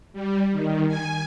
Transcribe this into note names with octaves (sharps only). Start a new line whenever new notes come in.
G3
D#3
G#5